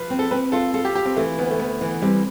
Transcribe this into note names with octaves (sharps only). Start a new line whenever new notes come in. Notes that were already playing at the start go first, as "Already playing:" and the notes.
Already playing: F3 B4
C4
A4
C4 B4
F4 A4
F4 A4
G4
F4 G4
C4
E3 A3
D2 B3
A3
D2 B3
E3
B3
G3 C4